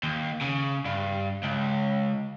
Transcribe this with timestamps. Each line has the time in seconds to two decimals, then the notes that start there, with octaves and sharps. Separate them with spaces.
0.03 D#2
0.42 C#3
0.86 G2
1.43 C#2